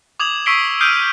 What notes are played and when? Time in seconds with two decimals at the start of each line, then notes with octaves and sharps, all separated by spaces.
0.20 D6 D#6 G#6 F7 F#7
0.46 C#6 E6 B6 C7 D7 G7
0.81 D#6 F6 G6 C7 D7 D#7